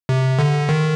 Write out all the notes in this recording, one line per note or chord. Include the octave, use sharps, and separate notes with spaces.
C3
D3
D#3